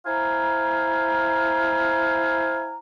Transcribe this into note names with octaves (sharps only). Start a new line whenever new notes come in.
E4 C5 F5 G#5 A#5